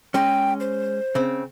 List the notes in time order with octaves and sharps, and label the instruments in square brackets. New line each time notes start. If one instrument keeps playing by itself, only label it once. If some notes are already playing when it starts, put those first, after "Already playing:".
[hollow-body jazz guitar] G#3 C#4 [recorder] G5
[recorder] C5
[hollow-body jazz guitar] C#3 C4